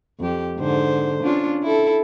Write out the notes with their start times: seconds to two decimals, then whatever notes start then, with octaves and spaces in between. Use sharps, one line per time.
0.20 F2 G4
0.56 G#2 D3 C5
1.23 C#4 D4 F4
1.63 E4 A4